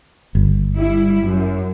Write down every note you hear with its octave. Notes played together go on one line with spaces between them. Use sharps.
G1
G3 E4
F#2